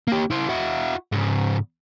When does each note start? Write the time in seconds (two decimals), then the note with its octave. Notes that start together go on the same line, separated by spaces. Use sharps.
0.08 A#3 G4
0.30 E4 C5
0.49 E4 F#4
1.12 G#2 C#3